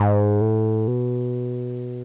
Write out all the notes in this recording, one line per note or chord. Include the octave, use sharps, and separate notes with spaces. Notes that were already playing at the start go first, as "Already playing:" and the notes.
Already playing: G#2
A2
B2